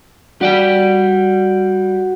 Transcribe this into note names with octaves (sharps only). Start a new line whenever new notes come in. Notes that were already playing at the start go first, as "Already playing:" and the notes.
G3 F#4 D5 G5